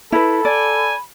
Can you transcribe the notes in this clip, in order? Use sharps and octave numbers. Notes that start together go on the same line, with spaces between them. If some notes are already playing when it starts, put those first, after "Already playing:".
E4 A4 B4 B5
D5 G#5